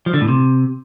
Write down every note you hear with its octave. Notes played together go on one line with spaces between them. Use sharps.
F3
D3
A2
C3